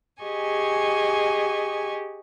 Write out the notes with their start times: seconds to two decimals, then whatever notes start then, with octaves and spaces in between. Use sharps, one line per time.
0.23 G4 G#4 D#5 G#5 C#6